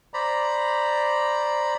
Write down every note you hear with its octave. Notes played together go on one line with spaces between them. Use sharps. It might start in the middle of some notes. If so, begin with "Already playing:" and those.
C5 D5 A#5 B5